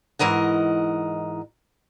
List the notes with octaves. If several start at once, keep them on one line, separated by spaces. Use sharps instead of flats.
G#2 E3 A#4 D#5 F#5